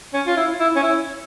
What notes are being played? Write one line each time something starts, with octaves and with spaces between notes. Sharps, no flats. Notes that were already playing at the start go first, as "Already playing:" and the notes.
C#4
F4
E4
E4
C#4
E4